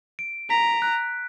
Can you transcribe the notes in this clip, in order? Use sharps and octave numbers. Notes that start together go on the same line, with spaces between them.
D7
A#5 B6
F#6